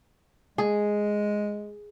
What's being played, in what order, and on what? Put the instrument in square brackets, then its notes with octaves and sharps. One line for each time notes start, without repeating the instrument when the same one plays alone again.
[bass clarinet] G#3 [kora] G#4